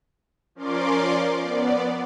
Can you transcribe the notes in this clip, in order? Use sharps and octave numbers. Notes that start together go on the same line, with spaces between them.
F3 C#4 A#4 D5 C6 D6
B3 D5